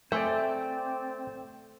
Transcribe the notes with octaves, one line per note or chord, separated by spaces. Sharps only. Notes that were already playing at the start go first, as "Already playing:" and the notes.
A3 C4 C5 D5 E5 G#5